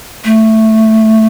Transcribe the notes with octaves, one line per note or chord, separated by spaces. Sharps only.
A3